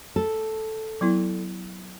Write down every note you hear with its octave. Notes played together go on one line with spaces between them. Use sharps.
A4
F#3 B3 E4